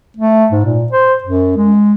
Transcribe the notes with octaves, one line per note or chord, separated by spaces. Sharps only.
A3
G#2
A#2
C5
F#2
G#3